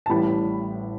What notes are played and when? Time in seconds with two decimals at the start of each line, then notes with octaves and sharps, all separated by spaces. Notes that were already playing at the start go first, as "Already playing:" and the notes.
0.06 A5
0.09 A1 A2 G3 B5